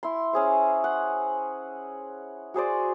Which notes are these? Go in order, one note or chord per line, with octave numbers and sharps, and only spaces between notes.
E4 C6
C#4 G#4 C5
F#5
F#4 G#4 C5 D5